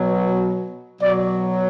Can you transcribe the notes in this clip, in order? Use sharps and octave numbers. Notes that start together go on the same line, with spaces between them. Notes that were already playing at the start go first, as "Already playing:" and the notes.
Already playing: B2 F#3
B2 F#3 D5